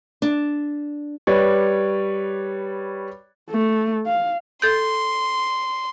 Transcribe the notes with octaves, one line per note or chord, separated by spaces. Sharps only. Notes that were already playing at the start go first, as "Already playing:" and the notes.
D4
G3 B4 C#5 D5
A3
F5
A4 C6 G6